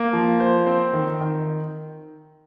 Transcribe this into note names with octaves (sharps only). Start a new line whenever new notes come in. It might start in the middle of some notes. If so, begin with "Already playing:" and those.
Already playing: A#3
F3
C5
C4
D#3
D#3